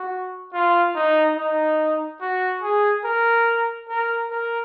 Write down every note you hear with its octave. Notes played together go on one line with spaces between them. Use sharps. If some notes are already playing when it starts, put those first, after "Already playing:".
Already playing: F#4
F4
D#4
D#4
F#4
G#4
A#4
A#4
A#4